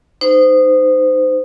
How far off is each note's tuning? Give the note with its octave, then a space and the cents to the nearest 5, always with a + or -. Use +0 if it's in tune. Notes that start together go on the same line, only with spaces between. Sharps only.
D#4 -15 C5 -25